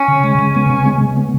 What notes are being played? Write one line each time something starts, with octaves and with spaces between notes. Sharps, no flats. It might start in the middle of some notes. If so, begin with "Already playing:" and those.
Already playing: C#4
C#3
G#3
C#3
B3
C#3
G#3
C#3
B3